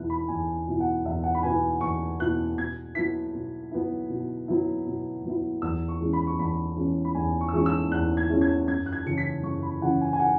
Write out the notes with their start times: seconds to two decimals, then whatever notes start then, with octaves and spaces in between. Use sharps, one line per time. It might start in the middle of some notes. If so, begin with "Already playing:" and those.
Already playing: E2 B2 B3 E4 F#6
0.10 B5
0.28 E2 G#5
0.68 B2 B3 E4
0.80 F#5
1.05 E2 E5
1.24 F#5
1.34 B5
1.43 B2 B3 E4 G#5
1.81 E2 C#6
2.20 B2 B3 E4 F#6
2.57 B2 G#6
2.95 F#3 B3 E4 B6
3.34 B2
3.71 F#3 B3 E4
4.09 B2
4.48 F#3 B3 E4
4.86 B2
5.25 F#3 B3 E4
5.62 E2 E6
5.88 C#6
6.00 E3 G#3 C#4 E4
6.13 B5
6.27 C#6
6.39 E2 B5
6.76 E3 G#3 C#4 E4
7.05 B5
7.15 E2 G#5
7.41 C#6
7.48 E6
7.53 E3 G#3 C#4 E4 C#6
7.66 E6
7.91 E2 F#6
8.17 G#6
8.29 E3 G#3 C#4 E4
8.41 G#6
8.68 F#2 G#6
8.86 F#6
8.93 G#6
9.06 C#3 E3 C#4 E4 C#7
9.18 B6
9.43 F#2 C#6
9.63 B5
9.81 C#3 E3 C#4 E4 F#5
10.01 G#5
10.13 G#5
10.19 F#5